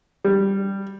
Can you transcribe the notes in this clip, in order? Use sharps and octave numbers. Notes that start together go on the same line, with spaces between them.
G3